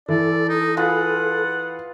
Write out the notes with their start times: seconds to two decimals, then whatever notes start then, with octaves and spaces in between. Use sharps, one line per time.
0.09 E3 A4 D5
0.49 D#4
0.77 F4 G#4 B4 F#5